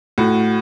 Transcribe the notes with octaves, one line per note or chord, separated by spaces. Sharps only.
A2 F#4